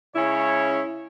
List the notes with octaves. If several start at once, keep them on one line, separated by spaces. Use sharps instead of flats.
C#3 G#3 C#4 E4 C#5